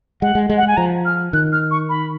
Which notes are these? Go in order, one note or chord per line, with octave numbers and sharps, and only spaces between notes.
G#3 F#5
G#3
G#3
F#5
G#3 G#5
F3 A#5
F6
D#3 F#6
F6
C#6
B5